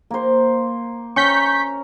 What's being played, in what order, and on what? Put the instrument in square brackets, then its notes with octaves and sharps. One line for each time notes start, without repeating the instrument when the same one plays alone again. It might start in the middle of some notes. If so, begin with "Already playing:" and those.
[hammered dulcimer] A#3 C5
[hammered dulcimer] C#4 A#5 [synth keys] C#6 G6 B6